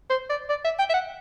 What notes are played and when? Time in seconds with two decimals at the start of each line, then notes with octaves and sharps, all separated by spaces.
0.10 C5
0.30 D5
0.50 D5
0.65 E5
0.79 G5
0.90 E5
0.94 F#5